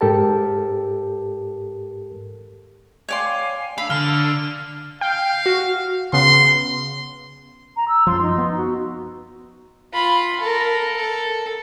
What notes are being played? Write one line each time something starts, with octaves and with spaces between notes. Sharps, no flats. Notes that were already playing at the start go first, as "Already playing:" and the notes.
G#2 G4 A4 A#4 A5
C#5 D5 F5 G5 G#5 C6
D4 F5 B5 E6
D3 F6
F5 G5
F#4
C#3 B3 C6
A#5
E6
F#2 F3 C6
D#4
B3
F#4
F4 B5
A4 A#4
A4